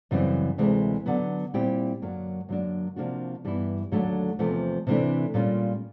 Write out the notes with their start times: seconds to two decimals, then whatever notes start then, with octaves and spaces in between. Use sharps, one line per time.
0.11 F#2 C#3 E3 G3 C4
0.58 D2 C3 E3 G#3
1.06 D3 F#3 B3
1.54 A#2 G3 C4 E4 G4
2.02 F#2 D3 F#3 A#3
2.49 F#2 D3 F#3 A#3 D4
2.96 C3 F3 A#3 D4 F#4
3.45 G2 E3 G3 B3 E4
3.91 D#2 D3 F#3 A3 D4
4.39 E2 C3 F3 A3
4.87 C3 E3 A3 D4
5.34 A#2 G3 A#3 C#4 F4